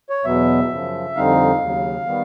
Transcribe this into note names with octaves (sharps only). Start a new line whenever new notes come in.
C#5
E2 B2 F#3 B3 E5
F#2 C#3 F3
F2 D3 G3 C4 D#4 F5
D#2 C#3 F#3
D#3 G3 B3